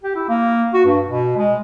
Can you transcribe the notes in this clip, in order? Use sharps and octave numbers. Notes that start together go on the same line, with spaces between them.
G4
E4
A#3
F#4
G2
B2
G#3